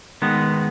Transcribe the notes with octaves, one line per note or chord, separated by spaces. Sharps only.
D#3 G#3 B3